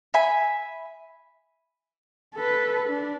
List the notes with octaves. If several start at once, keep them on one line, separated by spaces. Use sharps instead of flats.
E5 G#5 B5
A4 B4
D4